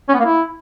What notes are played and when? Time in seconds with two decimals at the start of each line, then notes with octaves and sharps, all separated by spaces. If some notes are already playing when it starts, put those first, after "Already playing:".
0.09 C#4
0.14 B3
0.19 A#3
0.25 E4